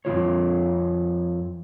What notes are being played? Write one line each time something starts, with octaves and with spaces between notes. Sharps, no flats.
F2 E3 F4 C#5